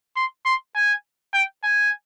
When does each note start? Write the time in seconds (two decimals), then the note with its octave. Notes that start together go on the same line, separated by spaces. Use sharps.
0.16 C6
0.45 C6
0.75 G#5
1.34 G5
1.63 G#5